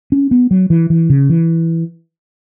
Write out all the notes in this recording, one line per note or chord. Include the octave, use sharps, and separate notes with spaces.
C#4
B3
F#3
E3
E3
C#3
E3